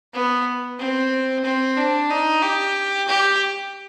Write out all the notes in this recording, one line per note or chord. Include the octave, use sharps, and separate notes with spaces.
B3
C4
C4
D4
D#4
G4
G4